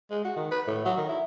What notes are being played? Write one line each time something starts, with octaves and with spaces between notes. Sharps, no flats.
G#3
F#4
D#3
B4
A2
F#3
D#3
E4